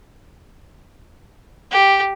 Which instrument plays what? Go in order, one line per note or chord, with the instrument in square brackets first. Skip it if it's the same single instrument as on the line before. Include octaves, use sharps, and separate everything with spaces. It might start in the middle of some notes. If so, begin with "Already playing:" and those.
[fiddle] G4